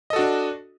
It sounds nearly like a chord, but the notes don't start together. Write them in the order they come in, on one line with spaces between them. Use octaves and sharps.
D#5 A4 F#4 D4